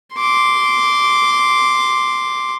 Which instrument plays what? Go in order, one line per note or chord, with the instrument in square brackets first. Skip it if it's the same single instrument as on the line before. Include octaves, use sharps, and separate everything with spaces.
[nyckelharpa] C6 D6